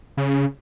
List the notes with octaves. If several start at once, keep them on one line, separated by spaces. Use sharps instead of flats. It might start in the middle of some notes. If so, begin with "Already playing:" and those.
C#3